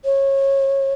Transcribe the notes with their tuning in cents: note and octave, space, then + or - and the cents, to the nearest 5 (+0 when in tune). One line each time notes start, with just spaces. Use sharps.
C#5 -25